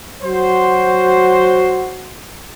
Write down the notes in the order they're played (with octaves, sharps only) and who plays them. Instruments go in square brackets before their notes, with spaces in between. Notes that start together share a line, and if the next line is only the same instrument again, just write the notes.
[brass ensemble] F#3 F#4 C5